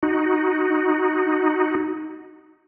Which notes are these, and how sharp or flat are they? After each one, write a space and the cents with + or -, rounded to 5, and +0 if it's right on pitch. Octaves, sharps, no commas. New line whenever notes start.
D#4 +0 F#4 +0